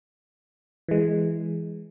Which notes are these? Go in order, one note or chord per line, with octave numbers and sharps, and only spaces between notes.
E3 G#3